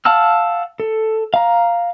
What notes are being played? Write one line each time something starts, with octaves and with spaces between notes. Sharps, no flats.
F5 F#5 A5 E6 F6
A4
F5 A#5